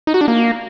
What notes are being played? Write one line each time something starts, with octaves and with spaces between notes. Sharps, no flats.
D#4
F#4
D4
A#3